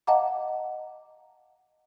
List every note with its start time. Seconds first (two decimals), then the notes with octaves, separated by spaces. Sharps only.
0.07 D#5 F5 F#5 A5 A#5 D6